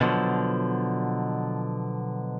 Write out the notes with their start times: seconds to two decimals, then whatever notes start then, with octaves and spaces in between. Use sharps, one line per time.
0.01 B2 D3 F3 F#3